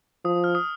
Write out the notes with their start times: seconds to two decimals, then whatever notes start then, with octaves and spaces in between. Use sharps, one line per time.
0.25 F3 D#6
0.44 F6
0.55 D#6